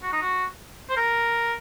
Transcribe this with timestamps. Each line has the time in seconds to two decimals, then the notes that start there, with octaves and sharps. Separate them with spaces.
0.03 F#4
0.13 D#4
0.22 F#4
0.90 C5
0.97 A#4